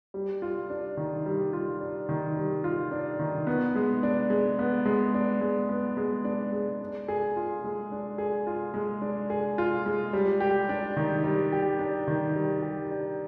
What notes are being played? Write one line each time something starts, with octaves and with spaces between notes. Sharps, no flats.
G3
F4
D4
D#3
G3
F4
D4
D#3
G3
F4
D4
D#3
B3
G#3
D4
G#3
B3
G#3
D4
G#3
B3
G#3
D4
G#3
D4
G#4
F4
G#3
D4
G#4
F4
G#3
D4
G#4
F4
G#3
G3
G4
D4
D#3
G3
G4
D4
D#3
G3
G4
D4